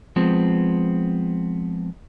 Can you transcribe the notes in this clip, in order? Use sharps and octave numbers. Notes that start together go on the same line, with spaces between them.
F3 G#3 B3 C4